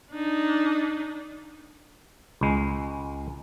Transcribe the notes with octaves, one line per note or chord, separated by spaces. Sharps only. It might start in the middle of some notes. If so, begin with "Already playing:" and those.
D4 D#4
C#2 G#3